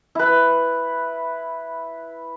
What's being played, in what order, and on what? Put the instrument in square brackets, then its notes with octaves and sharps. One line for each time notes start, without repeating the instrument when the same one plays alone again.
[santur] E4 B4